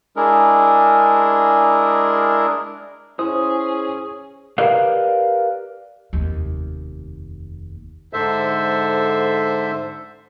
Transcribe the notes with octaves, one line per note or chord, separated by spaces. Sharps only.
G#3 D4 E4 G#4 A#4
C#4 E4 G#4 C5 D#6
G4 A#4 B4 D5 D#5 F5
F1 D#2
G#2 D3 A4 C5 E5